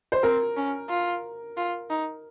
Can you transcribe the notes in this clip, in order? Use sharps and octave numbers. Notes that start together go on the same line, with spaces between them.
C5
C4 A#4
C#4
F4
F4
D#4